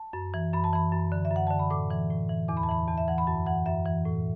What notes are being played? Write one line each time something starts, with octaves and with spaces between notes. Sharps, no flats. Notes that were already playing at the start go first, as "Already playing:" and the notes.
Already playing: A5
F#2
E3
F#2 B5
A5
E3 B5
F#2
D3
E5
F#2
F#5
D3 A5
B5
A2 D6
E3
A2
E3
E2 D6
B5
A5
E3 B5
E2 A5
E5
E3 F#5
B5
F#2 A5
E3 F#5
F#2 E5
E3
A2